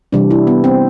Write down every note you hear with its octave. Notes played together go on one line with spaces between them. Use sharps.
C3 E3 G3 D4
E4
B3
C4